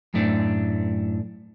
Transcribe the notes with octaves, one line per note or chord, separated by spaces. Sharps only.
F#2 A2 A3 D4